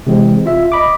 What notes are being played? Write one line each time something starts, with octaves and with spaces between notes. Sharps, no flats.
C3 E3 G#3 C4
F4 E5
D#5 B5 D6